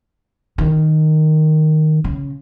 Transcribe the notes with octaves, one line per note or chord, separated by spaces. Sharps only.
D#3
C#3